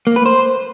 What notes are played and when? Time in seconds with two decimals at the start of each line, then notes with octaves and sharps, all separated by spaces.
0.07 A#3
0.16 B4
0.26 C5